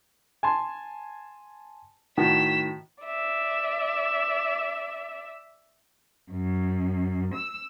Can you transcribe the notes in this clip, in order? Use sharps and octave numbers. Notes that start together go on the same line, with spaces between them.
G#5 A5 C6
A2 D#3 F#4 B6 E7
D5 E5
F#2
E6